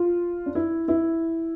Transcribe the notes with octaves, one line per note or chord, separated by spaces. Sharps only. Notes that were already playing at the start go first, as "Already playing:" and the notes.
Already playing: F4
D4
E4
E4